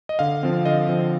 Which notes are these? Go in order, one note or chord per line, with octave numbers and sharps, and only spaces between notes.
D#5
D3 F5
F3 C4
D3 D#5
F3 C4